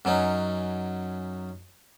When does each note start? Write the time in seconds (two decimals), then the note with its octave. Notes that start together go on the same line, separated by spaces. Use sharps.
0.05 F#2 F#3 C#4 D#4